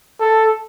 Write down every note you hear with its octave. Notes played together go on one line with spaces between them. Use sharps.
A4